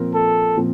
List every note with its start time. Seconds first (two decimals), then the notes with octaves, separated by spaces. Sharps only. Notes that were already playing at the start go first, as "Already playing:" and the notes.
Already playing: A#2 F3 C4 F4 A#4
0.14 A4
0.57 A#2 F3 C4